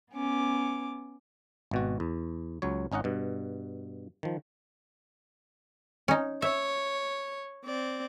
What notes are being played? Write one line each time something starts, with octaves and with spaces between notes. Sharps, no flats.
B3 C#4 D6
G#1 B2 F#4
E2
C#2 F#3 C#5
G#1 C#4 D#4 D#5 F#5
G2 B2
D#3 F3
C#4 D#4
C#5 E5
C4 D5